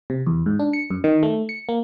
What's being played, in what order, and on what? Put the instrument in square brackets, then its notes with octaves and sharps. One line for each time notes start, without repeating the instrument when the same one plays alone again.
[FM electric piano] C3
E2
G#2
D4
C#7
F#2
D#3
A3
C#7
A#3